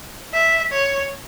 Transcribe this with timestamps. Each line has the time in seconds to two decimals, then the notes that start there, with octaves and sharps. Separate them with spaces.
0.34 E5
0.72 C#5